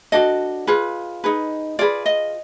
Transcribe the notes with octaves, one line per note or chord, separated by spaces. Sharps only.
D4 F#4 A4 D#5
F4 G#4 B4
D#4 G#4 B4
F4 G#4 B4 D5
D#5